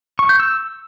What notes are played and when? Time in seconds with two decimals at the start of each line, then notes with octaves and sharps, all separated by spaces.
0.19 C#6
0.29 G6
0.40 E6